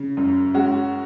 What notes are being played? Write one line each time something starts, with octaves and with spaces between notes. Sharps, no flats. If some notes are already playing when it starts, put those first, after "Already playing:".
Already playing: C#3
F#2
G#3 C#4 F#4